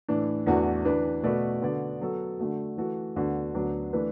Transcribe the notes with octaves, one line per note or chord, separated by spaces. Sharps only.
A2 E3 D4
E2 E3 A3 D4 F#4
E3 D4 B4
B2 A3 F#4 B4 D5
D3 B3 F#4 D5
F#3 B3 F#4 A4
D3 A3 F#4
E3 A3 F#4 A4
D2 D3 B3 F#4
D2 D3 F#3 B3 D4
E3 A3 D4 B4